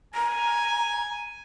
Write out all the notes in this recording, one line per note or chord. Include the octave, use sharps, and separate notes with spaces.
G#5 A#5